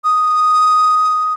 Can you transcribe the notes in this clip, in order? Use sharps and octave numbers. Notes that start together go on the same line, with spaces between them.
D#6